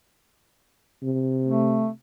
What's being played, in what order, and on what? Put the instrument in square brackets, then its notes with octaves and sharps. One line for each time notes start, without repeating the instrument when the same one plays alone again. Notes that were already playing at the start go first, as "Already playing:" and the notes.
[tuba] C3
[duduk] A3